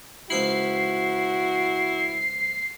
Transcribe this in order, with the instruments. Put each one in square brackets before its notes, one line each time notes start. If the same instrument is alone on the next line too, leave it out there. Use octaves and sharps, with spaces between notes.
[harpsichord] C#2 F3 B5 [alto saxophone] E4 [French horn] F#4 [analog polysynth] C7